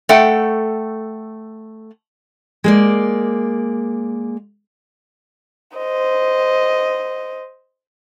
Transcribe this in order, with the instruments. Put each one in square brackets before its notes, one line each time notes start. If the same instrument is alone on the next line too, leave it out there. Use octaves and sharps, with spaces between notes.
[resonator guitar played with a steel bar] A3 A4 F#5 G5
[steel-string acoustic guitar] G#3 A#3 D5
[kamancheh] C5 D#5